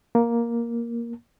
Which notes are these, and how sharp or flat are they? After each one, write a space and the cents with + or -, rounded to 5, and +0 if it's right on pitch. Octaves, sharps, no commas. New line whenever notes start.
A#3 +5